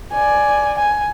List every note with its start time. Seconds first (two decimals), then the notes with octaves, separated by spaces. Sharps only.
0.13 D5 G#5
0.78 G#5